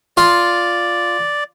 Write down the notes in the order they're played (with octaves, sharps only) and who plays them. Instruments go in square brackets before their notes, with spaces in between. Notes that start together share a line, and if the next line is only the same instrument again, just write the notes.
[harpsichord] F4 [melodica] D5